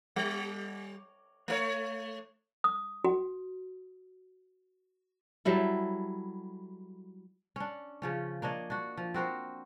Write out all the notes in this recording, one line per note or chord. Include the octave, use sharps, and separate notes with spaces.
G3
A3 A#4 C#5
D#6
F#4
F#3 G3 E4 A4
C#4 D4
C#3 F3 C#4
A#3 D4 C#5 D#5
D4 F#4
F3
C4 F#4 A#4 C5